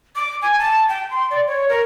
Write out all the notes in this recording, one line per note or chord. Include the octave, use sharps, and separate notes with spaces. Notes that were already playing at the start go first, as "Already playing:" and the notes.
D6
G#5
A5
G5
C6
D5
C#5
A#4